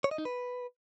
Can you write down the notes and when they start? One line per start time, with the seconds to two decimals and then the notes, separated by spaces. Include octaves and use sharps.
0.04 C#5
0.11 D#5
0.18 D#4
0.25 B4